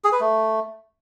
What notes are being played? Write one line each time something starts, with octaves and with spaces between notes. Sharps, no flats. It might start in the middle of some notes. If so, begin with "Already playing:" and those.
G#4
B4
A3